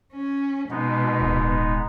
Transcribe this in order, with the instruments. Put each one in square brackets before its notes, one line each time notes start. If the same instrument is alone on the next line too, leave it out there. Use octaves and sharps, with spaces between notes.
[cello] C#4
[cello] B2 [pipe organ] G#3 B3 D#4
[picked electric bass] D1